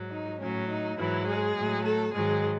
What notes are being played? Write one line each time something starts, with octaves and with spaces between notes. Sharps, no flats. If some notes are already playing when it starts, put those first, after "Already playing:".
Already playing: G#2 F#3
D#4
A2 F#3 C#4
D#4
G#2 E3 F#3 E4
G#3 G#4
A2 F#3
A3 A4
G#2 D#3 F#3 G#3 G#4